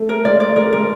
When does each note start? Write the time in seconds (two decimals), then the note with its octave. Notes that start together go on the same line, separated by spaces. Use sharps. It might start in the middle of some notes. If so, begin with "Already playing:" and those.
Already playing: A3
0.09 A#4
0.25 G#3 D5
0.40 D5
0.56 G#3 A#4
0.65 A3
0.72 G#3 A#4